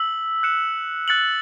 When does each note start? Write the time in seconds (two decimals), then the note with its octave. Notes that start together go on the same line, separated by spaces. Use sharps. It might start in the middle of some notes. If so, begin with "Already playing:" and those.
Already playing: E6 B6 F#7
0.43 F#6 C#7 E7
1.08 F#6 A6 C#7 F#7